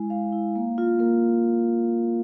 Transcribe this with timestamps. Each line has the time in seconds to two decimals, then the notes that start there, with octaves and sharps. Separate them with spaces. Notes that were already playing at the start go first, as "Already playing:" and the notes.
Already playing: G#3 E4 G#5
0.10 G#3 F5
0.32 E4
0.56 A#3
0.78 F4
0.99 A#3 A#4